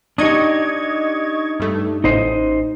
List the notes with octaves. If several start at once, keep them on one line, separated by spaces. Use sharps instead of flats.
D4 D#4 G4 D#5 C#6 G#6
G2 A3
A1 D#4 C5 D#5